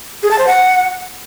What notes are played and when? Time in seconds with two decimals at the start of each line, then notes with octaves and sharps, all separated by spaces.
0.23 G#4
0.31 A5
0.39 C5
0.47 F#5